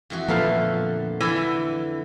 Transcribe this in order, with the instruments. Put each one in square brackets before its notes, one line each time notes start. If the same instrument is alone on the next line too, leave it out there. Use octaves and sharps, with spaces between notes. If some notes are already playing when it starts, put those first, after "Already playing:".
[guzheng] F2 E3 F#4
[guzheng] A#2 D3 A3 [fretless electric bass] F3 [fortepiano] B3 A4 F5
[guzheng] D3 A5 [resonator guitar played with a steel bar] E3